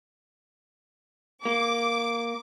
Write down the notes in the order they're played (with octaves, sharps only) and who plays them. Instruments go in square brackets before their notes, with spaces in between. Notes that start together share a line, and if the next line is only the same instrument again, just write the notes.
[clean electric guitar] A#3 [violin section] D6